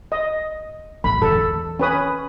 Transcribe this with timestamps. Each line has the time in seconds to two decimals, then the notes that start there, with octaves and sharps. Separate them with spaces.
0.12 D#5
1.04 A1 B5
1.22 E2 D#3 A4
1.79 C#4 B4 D#6